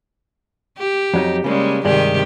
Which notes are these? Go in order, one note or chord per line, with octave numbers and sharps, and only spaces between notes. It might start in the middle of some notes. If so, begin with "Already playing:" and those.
G4
F2 F#3 D#4
C#3 G3 G#3 A#3 C#4
G2 C3 D#3 G#3 G4